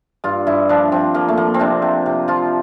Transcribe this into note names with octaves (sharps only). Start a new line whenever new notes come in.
G2 F4
G2 E4
F3 D4
F3 C4
F3 A#3
A3
F3 A#3
C4
C3 D4
C3
C3
F3 F4